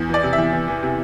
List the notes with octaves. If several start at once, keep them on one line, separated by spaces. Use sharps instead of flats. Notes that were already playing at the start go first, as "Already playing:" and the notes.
Already playing: E2
E3 D5
C3
E5
E2
E2
E3
C3